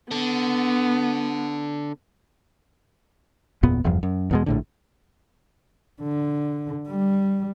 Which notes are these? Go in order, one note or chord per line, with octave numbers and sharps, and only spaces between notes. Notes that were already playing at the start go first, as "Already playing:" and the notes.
D3 B3
F#1 E2 A#2 B3
F1 E2 G2 F3
F#2
E2 B2 G#3
A#1 A2 D3
D3
G3